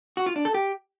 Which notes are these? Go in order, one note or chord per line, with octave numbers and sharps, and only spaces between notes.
F#4
F4
D4
A4
G4